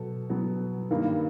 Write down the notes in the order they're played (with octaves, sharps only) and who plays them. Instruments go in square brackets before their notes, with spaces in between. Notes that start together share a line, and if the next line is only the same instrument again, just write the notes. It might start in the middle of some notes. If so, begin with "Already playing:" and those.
Already playing: [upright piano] B2 F#3 B3 A4
B2 F#3 B3
G2 D#3 G3 A#3